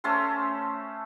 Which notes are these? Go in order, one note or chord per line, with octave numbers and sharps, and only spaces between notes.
A3 C#4 A4 C5